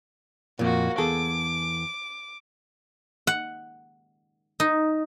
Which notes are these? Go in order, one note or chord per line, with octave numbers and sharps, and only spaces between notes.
F2 A#2 A#3 F#4
E2 G#4 A4 D6
F#5
D#4